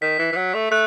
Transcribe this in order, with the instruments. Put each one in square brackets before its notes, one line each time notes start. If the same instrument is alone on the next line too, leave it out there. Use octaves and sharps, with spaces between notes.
[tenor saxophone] D#3 [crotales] B6
[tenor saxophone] E3
E3
F#3
A3
[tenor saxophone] A3 [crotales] F#6